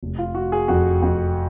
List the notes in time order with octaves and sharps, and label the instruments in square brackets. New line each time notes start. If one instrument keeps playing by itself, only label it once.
[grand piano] F1
F4
F3 F#4
G#4
F2 F#4
F2